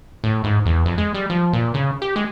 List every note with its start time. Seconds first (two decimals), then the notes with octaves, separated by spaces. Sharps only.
0.24 A2
0.44 G#2
0.66 E2
0.86 F2
0.98 G#3
1.14 G3
1.30 F3
1.53 A#2
1.74 C#3
2.02 G4
2.16 G#3